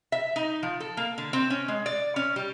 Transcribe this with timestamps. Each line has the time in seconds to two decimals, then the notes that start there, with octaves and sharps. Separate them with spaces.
0.12 E5
0.36 D#4
0.63 F3
0.80 A4
0.97 A#3
1.18 D3
1.33 C4
1.50 C#4
1.68 G#3
1.86 D5
2.16 C#4
2.36 G3